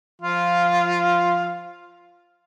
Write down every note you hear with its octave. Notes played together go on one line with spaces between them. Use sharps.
F3 F4 F5